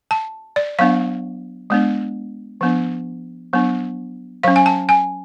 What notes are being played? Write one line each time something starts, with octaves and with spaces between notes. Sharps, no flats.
A5
D5
F#3 B3 D4 F5
G#3 B3 D4
F3 B3 D4
F#3 B3 D4
F#3 C#4 F5
G#5
A5
G#5